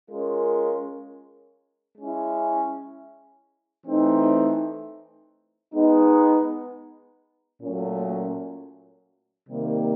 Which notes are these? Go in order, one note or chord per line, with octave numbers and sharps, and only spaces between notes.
G#3 C#4 F4 A#4
G#3 C#4 E4
E3 A3 C4 D#4
G#3 B3 D#4
A#2 F#3 A3 C#4
C3 D#3 G3 A#3